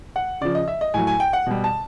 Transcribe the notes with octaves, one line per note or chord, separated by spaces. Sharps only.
F#5
C#3 F3 D5
D#5
E5
D#5
A2 F#3 G#5
G#5
G5
F#5
B2 G3
A5